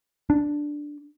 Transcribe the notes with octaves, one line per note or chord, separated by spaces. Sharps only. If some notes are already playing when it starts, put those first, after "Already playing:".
D4